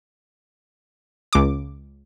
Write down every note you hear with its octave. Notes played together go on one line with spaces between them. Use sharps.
C#2 D6